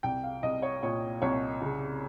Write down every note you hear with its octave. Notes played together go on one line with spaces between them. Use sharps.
C2 G5
F5
C2 D#5
C#5
A#2 C#5
C2 C#5
C#3